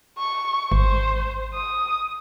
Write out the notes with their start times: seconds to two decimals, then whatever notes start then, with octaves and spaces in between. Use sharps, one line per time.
0.19 C#6
0.72 G#1 C5
1.54 D#6